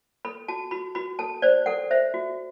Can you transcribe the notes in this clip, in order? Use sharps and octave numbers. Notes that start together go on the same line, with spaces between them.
A4 B5
F#4 A5
F#4 B5
F#4 B5
A4 A5
C5 D5
A4 F#5
C5 E5
F#4